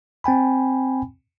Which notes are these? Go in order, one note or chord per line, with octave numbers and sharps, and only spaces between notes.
C4 G5 G#5 B5